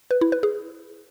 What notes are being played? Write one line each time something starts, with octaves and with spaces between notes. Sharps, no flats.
B4
E4
B4
G#4